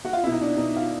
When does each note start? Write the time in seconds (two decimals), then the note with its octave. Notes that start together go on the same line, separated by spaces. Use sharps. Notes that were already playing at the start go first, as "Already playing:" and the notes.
0.05 F#4
0.13 F4
0.24 B2 E4
0.32 D#4
0.41 D4
0.57 B2 D#4
0.76 F4